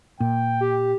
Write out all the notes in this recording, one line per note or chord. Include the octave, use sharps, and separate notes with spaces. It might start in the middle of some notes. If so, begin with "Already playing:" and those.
A#2 G5
G4